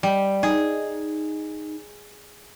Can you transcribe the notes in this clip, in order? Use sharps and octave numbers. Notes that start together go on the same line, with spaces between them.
G3
D#4 G#4